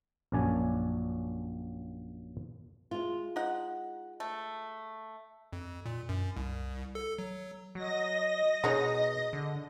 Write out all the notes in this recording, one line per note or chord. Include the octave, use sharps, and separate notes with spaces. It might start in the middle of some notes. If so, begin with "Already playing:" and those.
A#1 F#2 C#4 D4 D5 G#5
G#3 F4
D#4 F#5
A3
F2
A#2
F#2
C2
A4
F#3
F#3 D#5 A#6
B2 G#3 D#4 C#5
D3